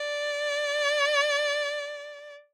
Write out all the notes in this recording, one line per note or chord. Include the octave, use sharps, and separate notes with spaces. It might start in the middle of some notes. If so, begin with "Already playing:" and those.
Already playing: D5